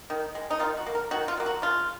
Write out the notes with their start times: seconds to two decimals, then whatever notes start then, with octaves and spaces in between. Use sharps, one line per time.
0.10 D#3
0.35 G#3
0.50 D#4
0.60 D#3 F4
0.77 F#4
0.86 A#3
0.95 A#4
1.11 D#3 F#4
1.28 F4
1.37 F#3 A#3
1.46 F#4
1.62 C#3 F4